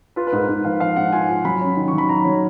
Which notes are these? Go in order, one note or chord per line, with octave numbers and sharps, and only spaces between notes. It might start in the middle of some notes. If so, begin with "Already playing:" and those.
F4 B4
B4
G#2 A#4
G#2 B4
F3 F5
F3 F5
G#2 F#5
F4 G#5
F4
F#3 B5
C#4
D#3
C#6
F#3
B5
D#3 A#5
F#3 C#5